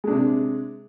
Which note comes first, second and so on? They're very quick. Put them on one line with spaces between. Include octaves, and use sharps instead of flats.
G#3 D4 C3